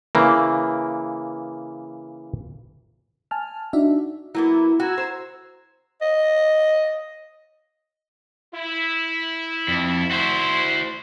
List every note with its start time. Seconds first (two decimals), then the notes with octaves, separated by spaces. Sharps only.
0.15 C#3 E3 A#3
3.31 G#5 A5 F6
3.73 D4 D#4 F#4 D5 E5
4.35 F#3 A#3 B3 E4
4.80 F#4 A#5 E6 G#6
4.98 C5
6.02 D#5
8.53 E4
9.68 F2
10.11 F#4 C5